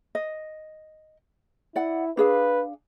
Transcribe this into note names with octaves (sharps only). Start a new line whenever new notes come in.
D#5
E4 D5 F#5
D4 G#4 B4 F5